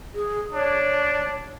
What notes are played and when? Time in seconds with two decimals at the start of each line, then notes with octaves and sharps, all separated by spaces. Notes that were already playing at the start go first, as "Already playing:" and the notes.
0.14 G#4
0.53 D4 C#5